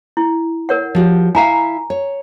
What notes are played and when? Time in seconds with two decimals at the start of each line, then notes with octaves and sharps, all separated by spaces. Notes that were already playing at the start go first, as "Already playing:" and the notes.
0.17 E4
0.69 A#4 C#5 F#5
0.95 F3 F#4 G4
1.35 E4 E5 F5 G#5 A#5
1.90 C#5